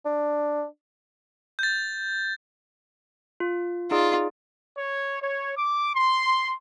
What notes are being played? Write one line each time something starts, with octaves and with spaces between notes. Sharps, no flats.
D4
G6 A6
F4
D#4 F4 G#4 D5
C#5
C#5
D6
C6